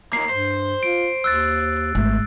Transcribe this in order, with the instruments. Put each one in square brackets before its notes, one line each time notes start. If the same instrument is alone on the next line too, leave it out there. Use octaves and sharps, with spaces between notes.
[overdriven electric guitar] D#2 A#3 [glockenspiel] C7
[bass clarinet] G2 [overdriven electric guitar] C5
[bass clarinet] F4 [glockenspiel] D7
[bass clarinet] D#2 [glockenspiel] E6 F#6 A6
[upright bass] G#1 [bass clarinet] A3